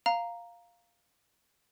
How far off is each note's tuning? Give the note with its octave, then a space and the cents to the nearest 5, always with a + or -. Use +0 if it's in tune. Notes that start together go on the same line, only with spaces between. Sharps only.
F5 +0 A#5 +0